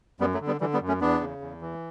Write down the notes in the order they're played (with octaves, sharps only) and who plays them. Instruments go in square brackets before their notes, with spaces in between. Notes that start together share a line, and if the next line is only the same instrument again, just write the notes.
[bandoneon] F#2 G3 B3
F#3 A3
D3
G3 B3
D3 E3 G3
G3 B3
F#2
A3 C#4
E2 B3 D4
C#3
E2
E3